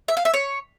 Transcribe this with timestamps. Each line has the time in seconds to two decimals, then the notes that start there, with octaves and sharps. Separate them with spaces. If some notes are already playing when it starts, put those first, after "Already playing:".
0.08 E5
0.17 F5
0.25 E5
0.34 C#5